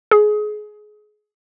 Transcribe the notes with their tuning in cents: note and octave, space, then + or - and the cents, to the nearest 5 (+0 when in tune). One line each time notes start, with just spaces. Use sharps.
G#4 +25